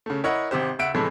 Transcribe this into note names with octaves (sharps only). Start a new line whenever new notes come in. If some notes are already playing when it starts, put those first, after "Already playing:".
C#3 A3
E4 A#4 C#5 D#5 F#5
G#1 C3 G4 C5
C#2 E5 F#5 D7
A2 C3 E3 F3 G#3 A3